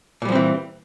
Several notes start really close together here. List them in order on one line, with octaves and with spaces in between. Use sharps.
A#2 G3 F3 C4 E3